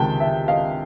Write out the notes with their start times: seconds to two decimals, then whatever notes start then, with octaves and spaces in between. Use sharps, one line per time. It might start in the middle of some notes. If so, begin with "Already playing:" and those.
Already playing: C#2 C3 D#3 G#3 G5 A5
0.20 E5
0.48 D#5 F5